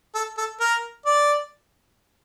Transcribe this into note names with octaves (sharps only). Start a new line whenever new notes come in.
A4
A4
A#4
D5